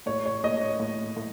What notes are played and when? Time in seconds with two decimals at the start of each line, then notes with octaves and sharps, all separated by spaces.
0.06 A2 C#5
0.26 C#5
0.44 A2 D#5
0.61 C#5
0.80 A2
1.16 A2